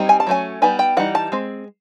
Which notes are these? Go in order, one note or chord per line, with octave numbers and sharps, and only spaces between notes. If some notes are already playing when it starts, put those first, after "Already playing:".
Already playing: G3 C4 D#4
G#5
A5
F#3 A3 C#4 G#5
G3 B3 D#4 G#5
G5
E3 G3 D#4 F#5
A5
G#3 C4